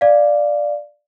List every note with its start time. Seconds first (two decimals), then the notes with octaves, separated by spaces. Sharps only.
0.01 D5 F5